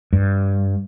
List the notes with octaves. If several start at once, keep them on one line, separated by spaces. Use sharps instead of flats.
G2